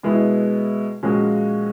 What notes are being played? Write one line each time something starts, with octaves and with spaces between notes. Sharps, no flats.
B2 G#3 B3 E4
A#2 F3 G#3 C#4 F#4